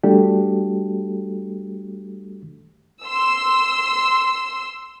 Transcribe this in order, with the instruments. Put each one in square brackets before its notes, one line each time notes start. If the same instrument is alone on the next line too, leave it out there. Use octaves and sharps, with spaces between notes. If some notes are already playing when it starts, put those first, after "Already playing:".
[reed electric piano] G3 A3 D4 F#4 G4 A4
[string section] C6 E6